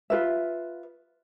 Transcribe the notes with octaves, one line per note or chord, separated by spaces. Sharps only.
F4 B4 E5